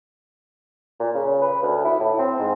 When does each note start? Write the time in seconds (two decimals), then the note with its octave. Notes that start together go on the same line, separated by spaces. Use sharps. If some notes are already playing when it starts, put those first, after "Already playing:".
0.99 A#2
1.15 C#3
1.41 B4
1.62 D2
1.84 E4
2.00 A2
2.19 C4
2.39 G#2